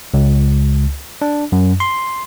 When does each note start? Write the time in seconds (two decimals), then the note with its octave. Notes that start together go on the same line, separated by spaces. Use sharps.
0.14 C#2
1.22 D4
1.52 F#2
1.80 C6